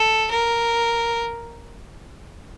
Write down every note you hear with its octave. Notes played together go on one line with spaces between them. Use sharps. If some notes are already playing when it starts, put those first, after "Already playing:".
Already playing: A4
A#4